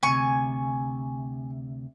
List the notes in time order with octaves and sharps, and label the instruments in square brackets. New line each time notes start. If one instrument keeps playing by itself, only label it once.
[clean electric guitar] D2 C3 [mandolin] G#5 C#6